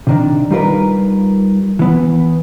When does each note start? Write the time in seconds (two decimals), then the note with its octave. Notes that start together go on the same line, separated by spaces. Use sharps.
0.07 C3 D#3 D4
0.50 G3 D#4 F4 G4 A#4 B4
1.79 E3 B3